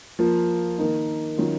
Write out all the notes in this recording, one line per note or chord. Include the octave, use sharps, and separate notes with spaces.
F3 A#3 F4
D#3 A#3 D#4
D#3 F#3 C#4 F4